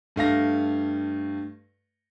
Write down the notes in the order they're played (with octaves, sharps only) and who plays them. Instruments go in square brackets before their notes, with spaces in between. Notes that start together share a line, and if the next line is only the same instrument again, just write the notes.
[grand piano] G2 A3 F5 A#6